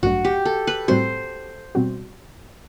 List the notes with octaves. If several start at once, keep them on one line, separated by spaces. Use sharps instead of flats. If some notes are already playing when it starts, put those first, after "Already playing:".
A1 G2 F#3 A3 D4 F#4
G4
A4
B4
A2 G3 C4 F#4 C5
B2 G3 C4 F#4